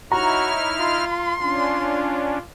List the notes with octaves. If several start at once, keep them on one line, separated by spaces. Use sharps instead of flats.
D#4 E4 F#4 C#5 A#5 F6
F4 C6
C#4 D4 F4